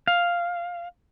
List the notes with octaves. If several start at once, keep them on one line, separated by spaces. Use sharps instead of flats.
F5